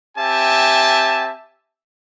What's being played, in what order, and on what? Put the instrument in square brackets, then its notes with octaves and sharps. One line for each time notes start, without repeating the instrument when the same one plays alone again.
[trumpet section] C4 G4 E5 G#5 A5